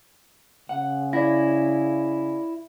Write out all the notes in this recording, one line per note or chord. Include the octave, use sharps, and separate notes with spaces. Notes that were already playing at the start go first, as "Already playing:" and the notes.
C#3 F#5
E4 D5 A#6